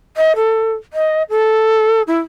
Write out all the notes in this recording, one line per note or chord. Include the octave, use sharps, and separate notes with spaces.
D#5
A4
D#5
A4
E4